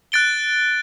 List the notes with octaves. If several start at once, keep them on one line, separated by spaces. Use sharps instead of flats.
F#6 A6 D7 G7